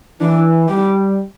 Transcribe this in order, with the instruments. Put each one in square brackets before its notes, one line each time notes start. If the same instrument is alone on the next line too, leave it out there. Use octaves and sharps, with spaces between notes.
[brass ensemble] E3 [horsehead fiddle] D4
[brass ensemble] G3 [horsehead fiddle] G4